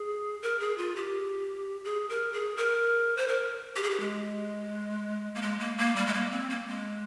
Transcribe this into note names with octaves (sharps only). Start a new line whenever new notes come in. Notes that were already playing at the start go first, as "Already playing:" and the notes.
Already playing: G#4
A#4
G#4
F4
G4
G#4
A#4
G#4
A#4
C5
A#4
G4
G#4
G4
G#3
A#3
G#3
A#3
A#3
G3
G#3
A#3
C4
A#3
G#3